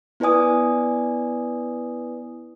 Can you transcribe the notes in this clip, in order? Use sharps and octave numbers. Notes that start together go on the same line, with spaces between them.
B3 E4 B4 D5 G#5 D#6